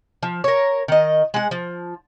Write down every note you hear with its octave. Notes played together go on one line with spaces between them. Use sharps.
F3
A#4 C#5
D#3 D#5
G#3 F#5
F3